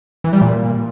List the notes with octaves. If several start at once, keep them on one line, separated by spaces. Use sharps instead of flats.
E3
G3
A#2